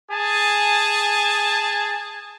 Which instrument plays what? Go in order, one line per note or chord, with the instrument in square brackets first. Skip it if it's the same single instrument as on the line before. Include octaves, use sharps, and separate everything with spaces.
[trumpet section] G#4 G#5 A5